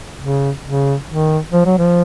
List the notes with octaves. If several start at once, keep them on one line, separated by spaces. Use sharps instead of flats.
C#3
C#3
D#3
F3
F#3
F3